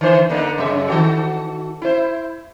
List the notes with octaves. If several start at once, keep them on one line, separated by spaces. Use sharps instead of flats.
D3 E3 C5
D3 A#3 D#4
F#2 C#3 E5
D#3 F#4 A4
E4 C5